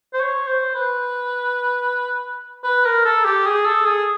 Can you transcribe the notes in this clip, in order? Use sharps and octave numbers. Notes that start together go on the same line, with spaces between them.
C5
C#5
C5
B4
B4
A#4
A4
G4
G#4
A4
G#4